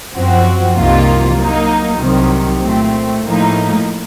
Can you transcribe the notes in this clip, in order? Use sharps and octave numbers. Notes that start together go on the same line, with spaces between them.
F#2 F3 C4 F#4
C2 C3 D#3 A#3 F4
F#3 A#3 D#4
C2 C3 D#3 F#3
A#2 A3 C4
A2 F3 A#3 D#4